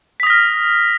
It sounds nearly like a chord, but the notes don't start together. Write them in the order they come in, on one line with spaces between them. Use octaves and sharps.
B6 D#6 A#6 F6